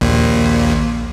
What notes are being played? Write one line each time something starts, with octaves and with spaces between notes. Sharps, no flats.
A#1 D#2 A#2